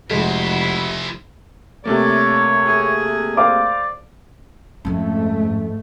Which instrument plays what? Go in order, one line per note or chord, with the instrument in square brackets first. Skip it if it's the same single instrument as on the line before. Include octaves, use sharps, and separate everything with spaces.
[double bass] F1 [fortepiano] G#3 [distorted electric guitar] E4 C5 [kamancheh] F#4 B5
[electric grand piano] C3 A3 A#3 [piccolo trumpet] C#5 [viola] D5
[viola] G#4
[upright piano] C5 F5 D6 [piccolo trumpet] D5
[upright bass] F2 C#4 [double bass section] G#2 A3